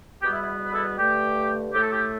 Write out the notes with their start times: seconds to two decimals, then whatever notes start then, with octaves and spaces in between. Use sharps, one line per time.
0.22 E2 B2 G3 B3 G4
0.31 E4
0.42 E4
0.65 B4
0.72 E4 A4
0.97 G2 D3 A3 G4
1.73 A2 A3 G4
1.82 A4
1.90 G4